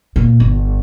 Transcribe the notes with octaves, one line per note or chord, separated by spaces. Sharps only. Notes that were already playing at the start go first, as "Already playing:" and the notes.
A#2
G1